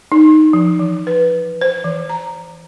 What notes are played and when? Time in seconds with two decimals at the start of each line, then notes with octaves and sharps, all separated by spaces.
0.12 D#4
0.53 F3
0.79 E3
1.07 B4
1.61 C5
1.84 E3
2.09 A#5